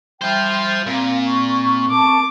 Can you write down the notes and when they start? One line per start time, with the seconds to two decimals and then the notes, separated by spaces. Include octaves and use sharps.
0.21 G3 F4 C5 E5 G5 B5
0.87 A#2 C4 F5
1.27 C#6
1.90 A5 C#6 D6